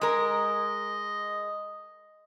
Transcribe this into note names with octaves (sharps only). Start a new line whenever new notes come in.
G#3 A#4 D#5